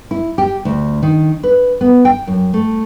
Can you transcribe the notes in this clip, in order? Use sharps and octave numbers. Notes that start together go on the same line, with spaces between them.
E4
G4
D2
D#3
B4
B3
G5
F#2
A3